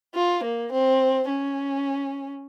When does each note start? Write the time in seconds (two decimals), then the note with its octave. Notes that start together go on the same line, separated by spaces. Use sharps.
0.14 F4
0.44 A#3
0.72 C4
1.29 C#4